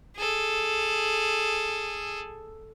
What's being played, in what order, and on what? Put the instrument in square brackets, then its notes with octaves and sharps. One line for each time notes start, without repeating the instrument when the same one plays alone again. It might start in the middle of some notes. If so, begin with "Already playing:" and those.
[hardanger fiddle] G#4 A4